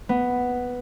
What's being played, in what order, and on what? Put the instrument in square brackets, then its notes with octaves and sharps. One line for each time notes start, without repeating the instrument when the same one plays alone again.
[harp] B3